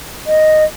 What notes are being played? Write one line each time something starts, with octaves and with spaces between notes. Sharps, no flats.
D#5